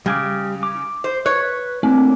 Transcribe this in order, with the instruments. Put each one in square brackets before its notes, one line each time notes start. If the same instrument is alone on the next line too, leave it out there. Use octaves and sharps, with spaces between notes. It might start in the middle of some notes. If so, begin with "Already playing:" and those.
[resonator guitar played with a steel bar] C#3 [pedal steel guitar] G3 G#5 D6
[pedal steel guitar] D6
[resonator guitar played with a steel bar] C5
[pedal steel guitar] B4 [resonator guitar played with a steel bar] C#5
[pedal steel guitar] A3 A#3 D4 [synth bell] C4